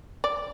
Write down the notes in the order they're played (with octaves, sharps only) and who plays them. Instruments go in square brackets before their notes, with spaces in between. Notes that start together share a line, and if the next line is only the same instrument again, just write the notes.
[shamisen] D5